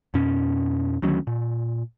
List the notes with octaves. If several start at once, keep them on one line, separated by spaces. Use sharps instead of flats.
F2 B2 C#4
D2 D#3 F#3 C#4
A#2